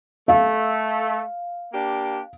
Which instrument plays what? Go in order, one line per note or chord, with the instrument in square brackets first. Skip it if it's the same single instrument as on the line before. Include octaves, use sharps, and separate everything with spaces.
[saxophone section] A3 [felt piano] F5
[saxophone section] A#3 D4 G4